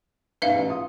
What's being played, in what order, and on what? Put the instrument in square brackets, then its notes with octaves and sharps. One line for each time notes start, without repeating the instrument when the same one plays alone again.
[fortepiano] G#2 B2 [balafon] B4 E5 F5
[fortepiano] A1
F4 D#6